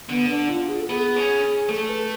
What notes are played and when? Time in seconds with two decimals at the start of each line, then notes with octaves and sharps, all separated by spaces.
0.09 D3 B3
0.29 D4
0.49 F4
0.69 G#4
0.80 A4
0.89 B3 G#4
1.16 C#4
1.69 A3 A4
1.89 B4